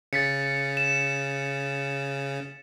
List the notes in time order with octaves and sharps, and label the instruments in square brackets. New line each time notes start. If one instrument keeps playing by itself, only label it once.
[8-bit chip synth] C#3 [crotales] A6 B6 C#7
[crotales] E7